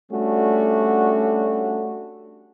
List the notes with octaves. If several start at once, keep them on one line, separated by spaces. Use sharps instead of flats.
G3 A3 C#4 D4 F#4